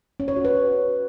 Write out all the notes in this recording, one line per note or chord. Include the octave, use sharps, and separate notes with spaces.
C#4
C#5
F#4
B4